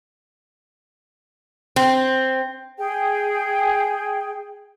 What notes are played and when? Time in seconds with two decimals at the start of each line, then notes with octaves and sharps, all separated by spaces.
1.76 C4
2.78 G#4 G5